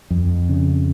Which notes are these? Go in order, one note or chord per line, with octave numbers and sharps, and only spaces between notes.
F2
C#3